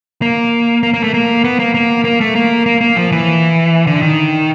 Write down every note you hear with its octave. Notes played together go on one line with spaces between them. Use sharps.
A#3
A#3
A#3
A3
A#3
B3
A#3
A#3
A#3
A3
A#3
A#3
A#3
F3
E3
D3
D#3